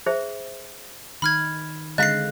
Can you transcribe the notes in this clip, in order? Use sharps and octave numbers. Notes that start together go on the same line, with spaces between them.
G#4 C5 E5
D#3 D#4 B5 F6 G#6
D3 G#3 C4 D#5 F5 F#6 A#6 C7